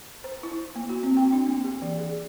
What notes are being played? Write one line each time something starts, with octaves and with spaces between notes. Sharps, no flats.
C5
E4
A#3
F#4
C4
G5
D4
A#3
G4
E3
G#4